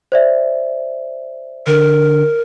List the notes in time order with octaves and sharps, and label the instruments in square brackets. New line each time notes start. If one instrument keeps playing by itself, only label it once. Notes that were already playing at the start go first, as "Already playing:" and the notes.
[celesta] C5 D5 E5
[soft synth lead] D3 [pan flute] A#4